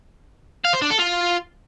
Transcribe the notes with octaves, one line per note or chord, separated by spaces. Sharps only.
F5
C5
D4
A4
F4